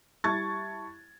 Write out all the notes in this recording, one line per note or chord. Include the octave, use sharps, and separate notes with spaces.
G3 E4 A5 C#6 G#6 A6